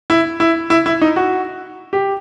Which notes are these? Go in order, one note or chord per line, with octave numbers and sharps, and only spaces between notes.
E4
E4
E4
E4
D#4
F#4
G4